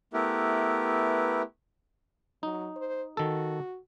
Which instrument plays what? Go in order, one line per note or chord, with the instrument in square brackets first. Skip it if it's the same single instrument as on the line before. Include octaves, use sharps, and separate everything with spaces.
[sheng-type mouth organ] A3 B3 E4 G4 A#4 B4
[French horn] F#3 [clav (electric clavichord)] D#4
[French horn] C5
[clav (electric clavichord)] D#3 A4 [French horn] F#4